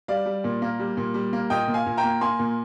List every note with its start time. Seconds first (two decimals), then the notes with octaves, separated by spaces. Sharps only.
0.08 G3 D5 F5
0.26 G3
0.44 A#2
0.62 A#3
0.80 G3
0.97 A#2
1.14 G3
1.33 A#3
1.50 A#2 D#5 G5
1.68 A#2
1.74 F5 G#5
1.86 A#2
1.97 G5 A#5
2.04 A#3
2.21 A#3 G#5 C6
2.39 A#2